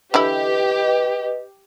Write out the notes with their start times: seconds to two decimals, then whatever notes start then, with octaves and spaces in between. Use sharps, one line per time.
0.14 D3 E3 E4 G4 B4 D#5